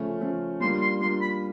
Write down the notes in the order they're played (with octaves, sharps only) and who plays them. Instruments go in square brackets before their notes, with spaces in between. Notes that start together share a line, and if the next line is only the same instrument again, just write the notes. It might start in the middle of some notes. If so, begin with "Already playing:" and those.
Already playing: [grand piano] C#3 F3 A3 C#4
C#3 F3 A3 C#4
[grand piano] G3 A#3 D4 F4 [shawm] C6
[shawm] C6
[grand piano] G3 A#3 D4 F4 [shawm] C6
[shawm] B5